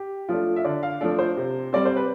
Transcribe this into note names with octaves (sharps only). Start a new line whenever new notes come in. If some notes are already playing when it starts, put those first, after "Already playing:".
Already playing: G4
F3 A3 D4 F4
E5
D3 D5
F5
F3 A3 D4 A4
C5
C3
G3 C4 D5
C5
B4